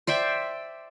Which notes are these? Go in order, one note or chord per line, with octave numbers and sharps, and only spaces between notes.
C5 D5 E5 G5